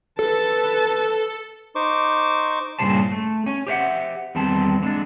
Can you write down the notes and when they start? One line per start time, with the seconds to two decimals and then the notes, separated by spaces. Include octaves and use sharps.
0.19 A4 B4 A5
1.75 D#4 C5 C#6 D6
2.79 G2 A#2 C#3 G3 C5 A5
3.12 A3
3.46 C#4
3.67 G4 C5 E5 F#5
4.35 E2 D#3 G3 C4 A5
4.83 D3 G#3 D4